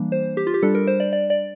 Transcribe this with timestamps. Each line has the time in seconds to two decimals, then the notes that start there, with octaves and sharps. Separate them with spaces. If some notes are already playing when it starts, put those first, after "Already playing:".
Already playing: E3 G3 A#3 D4
0.12 C5
0.37 G4
0.47 F4
0.54 G4
0.62 G3 D4 A4
0.75 A#4
0.87 C5
1.00 D5
1.13 D5
1.30 D5